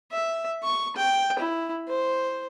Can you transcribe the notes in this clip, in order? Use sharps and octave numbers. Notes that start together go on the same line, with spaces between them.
E5
C#6
G5
E4
C5